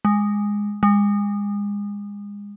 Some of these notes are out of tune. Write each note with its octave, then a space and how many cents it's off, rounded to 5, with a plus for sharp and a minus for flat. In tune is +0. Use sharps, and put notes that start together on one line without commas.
G#3 -10
G#3 -30